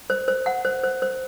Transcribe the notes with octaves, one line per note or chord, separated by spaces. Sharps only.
C5
C5
F#5
C5
C5
C5